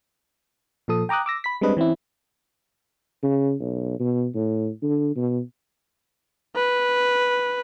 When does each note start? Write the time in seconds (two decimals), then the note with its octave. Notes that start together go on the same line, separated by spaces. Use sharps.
0.88 A#2 F3 A4 D#6
1.09 G5 A#5 D6 D#6 F#6
1.26 D6 E6 A#6
1.44 B5 B6
1.61 G3 G#3 C4 D4 B4 D#5
1.77 E3 C4 C#4 E4
3.23 C#3
3.60 B1
4.00 B2
4.34 A2
4.83 D3
5.16 B2
6.55 B4